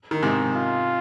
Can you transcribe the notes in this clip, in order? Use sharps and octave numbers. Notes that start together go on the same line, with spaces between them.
D#3
G#2 C3
F4